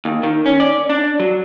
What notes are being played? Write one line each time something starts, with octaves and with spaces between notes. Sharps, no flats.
D#2
D#3
C#4
D5
D4
F#3